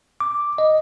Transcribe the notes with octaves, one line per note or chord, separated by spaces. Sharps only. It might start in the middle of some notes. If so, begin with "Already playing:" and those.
D6
D#5